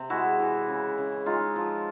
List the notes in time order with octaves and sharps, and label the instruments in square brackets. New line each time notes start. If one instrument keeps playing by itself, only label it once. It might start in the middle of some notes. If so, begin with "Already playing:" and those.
Already playing: [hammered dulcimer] C3
G#3 E4 F#4
E3
C#3
C#3
G#3 D#4 F4
F3